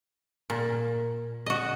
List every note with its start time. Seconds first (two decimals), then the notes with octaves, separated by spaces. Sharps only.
0.50 A#2
1.46 F#4 D#5